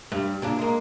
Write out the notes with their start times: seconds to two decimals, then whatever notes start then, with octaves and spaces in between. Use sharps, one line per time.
0.12 G2
0.42 A#2 C#3 D4
0.59 G#3 A#3